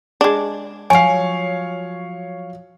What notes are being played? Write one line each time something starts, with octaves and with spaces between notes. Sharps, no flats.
G#3 D4
F3 F#3 C#5 F5 G#5